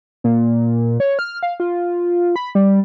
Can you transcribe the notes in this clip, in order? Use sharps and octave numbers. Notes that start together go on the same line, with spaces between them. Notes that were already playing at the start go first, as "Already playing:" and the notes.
A#2
C#5
F6
F5
F4
B5
G3